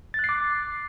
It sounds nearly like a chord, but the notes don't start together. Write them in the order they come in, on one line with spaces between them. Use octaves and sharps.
A6 F#6 C7 D6